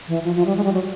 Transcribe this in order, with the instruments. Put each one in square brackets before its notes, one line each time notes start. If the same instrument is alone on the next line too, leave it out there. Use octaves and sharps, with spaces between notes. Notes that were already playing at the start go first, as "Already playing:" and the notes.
[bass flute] E3
F3
F3
G3
G#3
G3
F#3